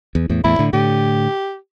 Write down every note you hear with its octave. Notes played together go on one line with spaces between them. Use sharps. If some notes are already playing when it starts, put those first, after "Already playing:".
E2
E2 A2
E2 A2 E4
A2 D3
A2 D3 G4